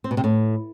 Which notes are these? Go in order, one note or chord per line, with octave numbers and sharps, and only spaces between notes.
C4
B2
C3
A2